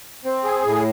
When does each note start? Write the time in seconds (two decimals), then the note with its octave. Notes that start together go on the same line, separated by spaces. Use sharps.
0.25 C4
0.44 G#4
0.66 A2